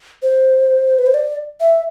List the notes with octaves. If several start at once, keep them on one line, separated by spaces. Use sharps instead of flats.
C5
B4
C5
D5
E5